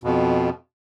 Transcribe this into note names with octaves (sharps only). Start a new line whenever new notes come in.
F2 B2